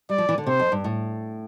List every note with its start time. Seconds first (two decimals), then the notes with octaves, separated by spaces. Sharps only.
0.09 G3 D5
0.18 F3
0.29 E3
0.38 D3
0.46 C3 C5
0.60 F2
0.72 G2
0.84 A2